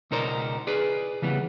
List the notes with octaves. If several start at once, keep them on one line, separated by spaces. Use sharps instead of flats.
C#2 B2 D#4 A#4 C5 D5
G#4 B4 D5
C#3 E3 G3 B3